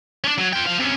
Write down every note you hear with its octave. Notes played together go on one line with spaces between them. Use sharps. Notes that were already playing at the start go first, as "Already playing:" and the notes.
C#4 D4
F#3
F4 G5
F3 F5
C3 C#4